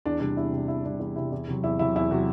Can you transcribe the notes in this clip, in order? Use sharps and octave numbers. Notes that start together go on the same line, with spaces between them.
E2 D4
C3 G3 D4
E2 E4
C3 G3
E2 E4
C3 G3 D4
E2 D4
C3 G3 E4
E2
C3 F#3
E2 E4
C3 F#3 E4
E2 E4
C3 F#3 F#4